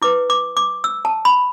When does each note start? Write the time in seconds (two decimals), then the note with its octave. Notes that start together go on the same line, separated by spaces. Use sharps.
0.02 E4 B4 D6
0.30 D6
0.57 D6
0.84 E6
1.05 A5
1.25 B5